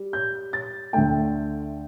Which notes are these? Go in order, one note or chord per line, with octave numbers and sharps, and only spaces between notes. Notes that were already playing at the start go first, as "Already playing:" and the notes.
Already playing: G3
G6
A6
D2 D3 A3 G5